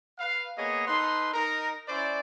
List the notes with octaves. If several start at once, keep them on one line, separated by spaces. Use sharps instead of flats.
B4 F5
A#3 B3 G#4 C#5 D#5
D#4 A4 B4 C6
D#4 A#4
C#4 E4 C5 D5